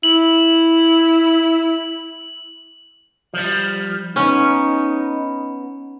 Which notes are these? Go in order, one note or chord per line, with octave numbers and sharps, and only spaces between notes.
E4 F#7
F3 G3
B3 C#4 D#4